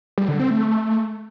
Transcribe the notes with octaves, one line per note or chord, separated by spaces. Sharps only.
G3
D3
C4
A3